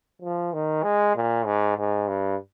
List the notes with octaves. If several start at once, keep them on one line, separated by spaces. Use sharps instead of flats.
F3
D#3
G#3
A#2
G#2
G#2
G2